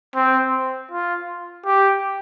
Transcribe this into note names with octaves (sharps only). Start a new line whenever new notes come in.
C4
F4
G4